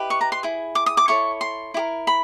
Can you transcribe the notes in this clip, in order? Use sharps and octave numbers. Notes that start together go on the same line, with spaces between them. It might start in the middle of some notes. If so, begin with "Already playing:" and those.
Already playing: E4 G4 B4 D#5
C#6
A#5
C6
E4 G#4
D6
D#6
D6
E4 A4 C#5 C#6
C6
E4 G4 A#4
B5